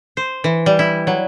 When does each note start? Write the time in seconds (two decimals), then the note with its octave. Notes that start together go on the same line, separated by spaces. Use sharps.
0.17 C5
0.44 E3
0.66 G3
0.79 E4
1.07 F#3